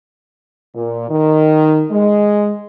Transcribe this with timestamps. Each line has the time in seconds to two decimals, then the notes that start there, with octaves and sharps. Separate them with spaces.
0.75 A#2
1.08 D#3
1.91 G#3